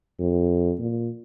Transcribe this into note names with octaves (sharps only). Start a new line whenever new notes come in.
F2
A#2